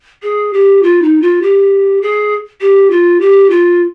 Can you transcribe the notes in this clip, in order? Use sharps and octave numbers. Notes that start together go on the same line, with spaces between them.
G#4
G4
F4
D#4
F4
G4
G#4
G4
F4
G4
F4